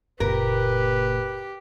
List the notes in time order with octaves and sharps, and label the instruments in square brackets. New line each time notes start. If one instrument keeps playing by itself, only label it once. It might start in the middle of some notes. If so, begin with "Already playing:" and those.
[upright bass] F#1 A#2 [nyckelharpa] G4 [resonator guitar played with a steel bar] A#4 [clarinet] B4